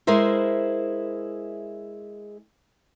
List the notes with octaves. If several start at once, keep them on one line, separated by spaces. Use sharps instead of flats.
G#3 E4 A#4 C5 E5